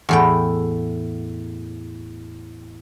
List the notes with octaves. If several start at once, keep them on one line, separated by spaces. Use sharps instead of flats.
E2 A2 G5